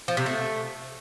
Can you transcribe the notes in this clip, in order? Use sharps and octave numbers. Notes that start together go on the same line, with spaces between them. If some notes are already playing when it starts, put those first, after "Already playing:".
F3
C3
A3